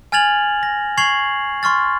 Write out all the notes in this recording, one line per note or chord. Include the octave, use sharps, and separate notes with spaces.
G#5 F6 G#6 A6 F7 F#7
A#6
C#6 G#6 C7 F7 F#7
C6 C#6 F6 A6